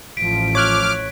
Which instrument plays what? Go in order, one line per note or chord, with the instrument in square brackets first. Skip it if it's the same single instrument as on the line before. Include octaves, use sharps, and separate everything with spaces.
[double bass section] A1 F3 [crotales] B6 D7
[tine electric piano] C#5 F#6 G#6 [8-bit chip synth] D6 F6